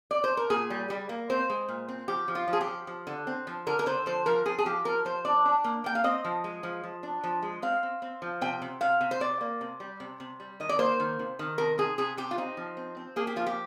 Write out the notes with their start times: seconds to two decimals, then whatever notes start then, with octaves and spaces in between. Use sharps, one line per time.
0.11 D5
0.24 C5
0.37 A#4
0.50 A#2 G#4
0.70 G3
0.90 G3
1.09 A#3
1.30 C4 C5
1.50 G#3
1.68 A#2
1.88 C4
2.08 F3 G4
2.28 F3
2.35 F4
2.48 F3
2.53 G#4
2.61 G4
2.68 F3
2.87 F3
3.07 D3
3.27 C4
3.47 F3
3.67 D3 A#4
3.79 A#4
3.86 D3 C5
4.06 F3 C5
4.26 F3 A#4
4.45 F3 G#4
4.59 G#4
4.65 F3 G4
4.85 F3 A#4
5.05 F3 C5
5.25 D4 D5
5.45 D4
5.64 A#3
5.84 A#3 G5
5.95 F5
6.04 C4 D#5
6.24 F3
6.44 G#3
6.63 F3
6.84 F3
7.03 D4
7.24 F3
7.42 G#3
7.62 C4 F5
7.83 C4
8.02 C4
8.22 F3
8.41 C3 G5
8.62 C3
8.81 C3 F5
9.01 C3
9.11 C5
9.20 C3 D5
9.41 A#3
9.61 C3
9.80 G3
10.00 C3
10.20 C3
10.40 G3
10.60 D#3 D#5
10.69 D5
10.79 A#3 C5
11.00 D#3
11.19 C3
11.39 D#3
11.58 C3 A#4
11.78 C3 G#4
11.98 C3 G#4
12.17 C3 G4
12.31 F4
12.38 C4 D#4
12.57 F3
12.77 C4
12.97 C4
13.16 A#3 G#4
13.27 G4
13.36 F3 F4
13.46 G4